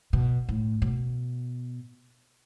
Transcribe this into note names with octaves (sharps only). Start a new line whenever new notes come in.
B2
A2
B2